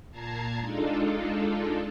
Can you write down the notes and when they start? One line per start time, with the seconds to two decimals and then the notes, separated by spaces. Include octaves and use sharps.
0.11 A#2 A5 A#5 G#6 C7
0.60 G#3 D4 D#4 F4 A4